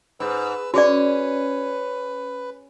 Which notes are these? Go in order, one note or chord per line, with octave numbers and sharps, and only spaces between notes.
G#2 B4 E6
C#4 F#4 G#4 B4 D5